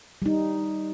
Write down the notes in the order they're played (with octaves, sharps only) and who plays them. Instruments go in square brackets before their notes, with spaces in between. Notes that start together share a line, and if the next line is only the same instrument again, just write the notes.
[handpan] G3 D#4